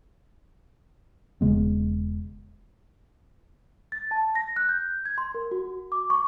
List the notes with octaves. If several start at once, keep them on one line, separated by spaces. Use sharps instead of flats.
E1 C#3 G#3 B3
A6
A5
A#6
F#6
G6
G#6
C6
A#4
F#4
D6
C#6